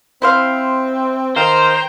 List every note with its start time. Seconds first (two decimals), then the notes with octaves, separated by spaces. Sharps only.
0.22 C4 E4 C5 F5
1.36 D#3 C5 F5 G5 A#5